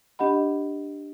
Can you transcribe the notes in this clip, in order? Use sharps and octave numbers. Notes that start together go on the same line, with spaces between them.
D4 G4 D#5 F#5 B5